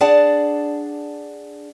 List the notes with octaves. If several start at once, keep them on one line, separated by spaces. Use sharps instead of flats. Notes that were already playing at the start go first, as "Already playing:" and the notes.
D4 G#4 D5 F#5 A5